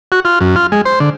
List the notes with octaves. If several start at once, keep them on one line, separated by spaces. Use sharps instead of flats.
F#4
F4
F#2
F4
G#3
C5
D3